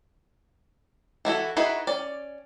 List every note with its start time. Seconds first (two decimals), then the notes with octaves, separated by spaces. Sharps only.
1.25 E3 E4 F#4 A4
1.57 D#4 E4 F#4 G#4 B4
1.87 C#4 D5